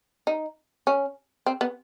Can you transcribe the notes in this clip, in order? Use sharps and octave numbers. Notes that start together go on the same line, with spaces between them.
D#4
C#4
C4
B3